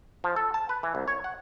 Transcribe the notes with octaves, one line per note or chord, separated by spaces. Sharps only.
F3
A4
A5
B4
E3
C2
C#5
F#5